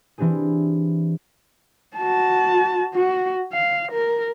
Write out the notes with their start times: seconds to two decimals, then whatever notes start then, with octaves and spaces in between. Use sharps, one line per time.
0.18 E3 C4 D4 G4 G#4
1.97 F#4 A5
2.95 F#4
3.53 F5
3.92 A#4